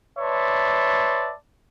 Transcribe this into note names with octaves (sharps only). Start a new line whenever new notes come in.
B4 C#5 D5 E5 A5 C6